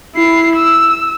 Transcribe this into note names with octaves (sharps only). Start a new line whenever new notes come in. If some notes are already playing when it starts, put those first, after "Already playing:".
E4 C7
E6